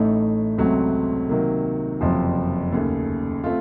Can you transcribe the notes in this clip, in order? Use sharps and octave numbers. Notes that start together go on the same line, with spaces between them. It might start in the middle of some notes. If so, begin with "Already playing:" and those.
Already playing: A1 A2 A3 D#4 A4
C#2 C3 F#3 A3 C4
C3 D#3 F#3 A#3
F#1 F2 C3 F3
D#2 C#3 A3
A3 C4 F4